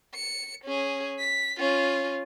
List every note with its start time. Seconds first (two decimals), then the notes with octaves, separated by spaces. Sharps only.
0.14 C#7
0.64 C#4 G#4
1.18 B6
1.58 C#4 F4